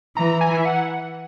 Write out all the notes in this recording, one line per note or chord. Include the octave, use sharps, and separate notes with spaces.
E3 A#5
G#5
E5
F#5